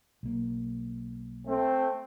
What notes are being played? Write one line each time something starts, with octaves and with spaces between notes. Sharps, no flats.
B1 A#3
A3 C4